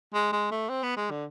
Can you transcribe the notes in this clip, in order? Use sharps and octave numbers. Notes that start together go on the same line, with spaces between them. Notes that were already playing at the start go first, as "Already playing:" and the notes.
G#3
G#3
A3
C4
B3
G#3
D3